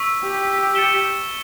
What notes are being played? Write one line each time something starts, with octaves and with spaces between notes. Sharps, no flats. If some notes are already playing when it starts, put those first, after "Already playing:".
Already playing: C#6 E6 B6
G4
A6 C#7 E7 G7